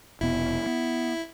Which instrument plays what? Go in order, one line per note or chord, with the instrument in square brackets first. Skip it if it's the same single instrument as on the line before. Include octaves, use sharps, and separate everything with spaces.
[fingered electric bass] F1 B2 B3 [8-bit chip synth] E4
[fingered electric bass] B3